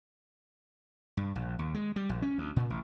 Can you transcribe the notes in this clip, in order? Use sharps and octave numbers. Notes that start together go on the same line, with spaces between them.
G2
A#1
D#2
G#3
G3
A#1
C#4
D2
A#2
A1